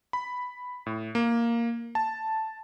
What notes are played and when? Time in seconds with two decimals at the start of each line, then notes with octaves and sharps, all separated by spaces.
0.13 B5
0.86 A2
1.15 A#3
1.95 A5